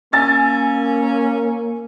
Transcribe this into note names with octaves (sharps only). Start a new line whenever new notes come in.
A#3 C#4 G#5 E6 A6